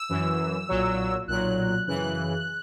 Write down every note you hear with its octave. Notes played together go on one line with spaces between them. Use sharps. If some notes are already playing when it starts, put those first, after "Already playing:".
Already playing: E6
F#2 E3
B1 A#2 F#3
B1 A#2 F#3 F#6
F#2 C#3 E3 F#6